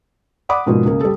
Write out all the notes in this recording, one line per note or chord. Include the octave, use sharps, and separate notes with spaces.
D5 F#5 B5 D6 D#6
G#2 B2 F3 G#3 A#3
C#2 C#3 A#3
G3 A4